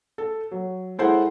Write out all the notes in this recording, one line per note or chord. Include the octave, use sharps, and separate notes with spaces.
A4
F#3
G#3 E4 A4 C5 F#5